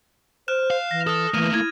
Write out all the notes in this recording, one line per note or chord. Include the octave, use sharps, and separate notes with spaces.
C5 F6 F#6 E7
F5
E3 A#6
A4 D#6 F6
E3 A3 A#3 F6 D#7
E4 G#6